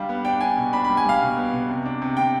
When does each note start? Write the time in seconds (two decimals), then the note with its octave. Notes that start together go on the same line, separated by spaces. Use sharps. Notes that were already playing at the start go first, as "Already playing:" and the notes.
Already playing: G3 D4 F5
0.09 B3
0.25 D4 G5
0.41 D4 G#5
0.57 B2
0.73 D4 B5
0.84 B5
0.89 G3
0.97 G#5
1.05 G3 F5
1.22 B2
1.37 B3
1.53 B2
1.69 C3
1.86 D4
2.02 C3
2.17 C3 G5